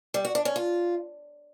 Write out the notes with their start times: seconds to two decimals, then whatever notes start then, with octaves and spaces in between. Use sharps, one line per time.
0.14 G3
0.25 F#4
0.35 D4
0.45 C#4
0.56 F4